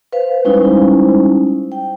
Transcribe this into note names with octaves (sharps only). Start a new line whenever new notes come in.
B4 C5 F5
G3 G#3 C#4 D#4 E4 C5
G5